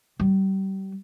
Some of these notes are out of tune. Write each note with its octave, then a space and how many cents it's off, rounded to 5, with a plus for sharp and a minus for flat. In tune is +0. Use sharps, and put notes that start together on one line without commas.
G3 -30